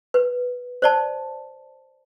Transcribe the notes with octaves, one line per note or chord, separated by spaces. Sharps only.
B4
C5 D5 A5